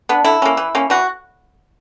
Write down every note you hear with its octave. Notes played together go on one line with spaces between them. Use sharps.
B3 D4
D3 E4
A#3 C#4
E3
A#3 C#4
E3 F#4